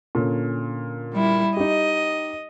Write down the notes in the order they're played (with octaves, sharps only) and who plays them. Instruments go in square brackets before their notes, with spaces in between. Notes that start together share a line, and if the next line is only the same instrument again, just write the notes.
[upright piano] A#2 D3 C#4
[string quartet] G3 E4
[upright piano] D#4 G4 [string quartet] D#5